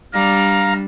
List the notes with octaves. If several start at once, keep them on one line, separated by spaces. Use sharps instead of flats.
G3 D4 F5 A#5